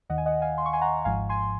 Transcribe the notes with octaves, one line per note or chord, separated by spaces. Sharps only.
D#2 D#3 D#5 F#5
G#5
D#5 F#5
F5 G#5
C6
C#6
G#5 C6
F#5 A#5
G#1 G#2 F3 F5 G#5
G#5 C6